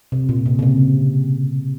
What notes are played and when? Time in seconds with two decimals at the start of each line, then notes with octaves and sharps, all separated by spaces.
0.12 C3
0.29 A#2
0.46 C3
0.59 C#3
0.63 C3